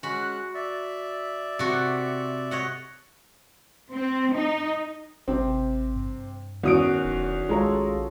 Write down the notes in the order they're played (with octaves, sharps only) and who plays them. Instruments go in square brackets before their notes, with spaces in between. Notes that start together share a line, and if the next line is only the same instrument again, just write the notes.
[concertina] G#3 C#4 F#6 [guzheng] F#4 B5
[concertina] D5 E5
[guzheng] C3 F#4 A4
C#5 D#5 F#5
[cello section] C4
D#4
[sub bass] G#1 [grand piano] C3 C4
[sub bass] G2
[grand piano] E2 D#6 D7 [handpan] D#3 C#4 F#4
[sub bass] E1
[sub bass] A#1 [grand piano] G#3 A#5 [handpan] F4 A4 C#5